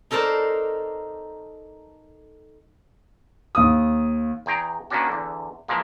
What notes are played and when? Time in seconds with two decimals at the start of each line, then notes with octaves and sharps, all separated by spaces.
0.11 D#4 A4 A#4 C5 D5
3.55 D#2 D#6
4.46 E2 G#4 G5 A#5
4.90 D#3 A#3 B3 C#4 D4 F#4
5.08 E2 D3
5.68 E3 F3 G#3 A#3